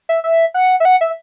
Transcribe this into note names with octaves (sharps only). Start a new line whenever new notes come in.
E5
E5
F#5
E5
F#5
E5